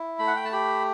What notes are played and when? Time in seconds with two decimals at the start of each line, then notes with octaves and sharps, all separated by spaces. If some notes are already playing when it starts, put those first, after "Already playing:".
Already playing: E4
0.19 A3 B5
0.27 F#5
0.36 G5
0.45 A5
0.53 G4 B5